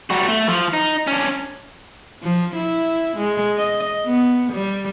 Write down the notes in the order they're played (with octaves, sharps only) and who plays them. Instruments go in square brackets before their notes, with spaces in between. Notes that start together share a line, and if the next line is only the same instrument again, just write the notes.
[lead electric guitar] G3 F#4
A3
F3
D#4
C#4 D4
[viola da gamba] F3
E4
G#3
D#5
B3
G3